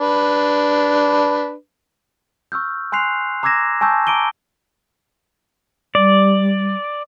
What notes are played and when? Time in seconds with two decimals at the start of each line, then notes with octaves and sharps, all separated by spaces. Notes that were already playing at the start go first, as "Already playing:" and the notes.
0.01 D4 B4
2.52 C#6 E6 F6 G6
2.92 G#5 C6 F#6 C7 F7
3.43 A#5 D6 E6 G#6 A#6 E7
3.81 G#5 A5 C#6 E6 G6
4.07 A#5 D6 D7 D#7 G7
5.95 G3 D5